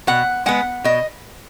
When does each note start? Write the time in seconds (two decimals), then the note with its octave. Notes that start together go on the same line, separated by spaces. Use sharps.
0.07 B2 F#5
0.46 G#3 B3 F#5
0.84 B2 D#5